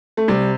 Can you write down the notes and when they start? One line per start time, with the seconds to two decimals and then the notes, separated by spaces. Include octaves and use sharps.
0.17 A3
0.28 C3 G3